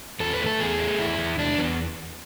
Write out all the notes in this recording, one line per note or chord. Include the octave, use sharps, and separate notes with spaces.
E2 A4
B4
A3
A4
E2 G#4
A3
E2 E4
E2
E2 D4
E2 B3